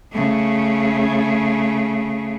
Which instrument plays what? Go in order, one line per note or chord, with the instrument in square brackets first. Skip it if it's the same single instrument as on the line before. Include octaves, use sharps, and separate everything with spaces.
[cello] C#3 A3